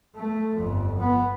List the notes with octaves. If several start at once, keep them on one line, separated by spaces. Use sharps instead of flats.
A3
G1 F2
B3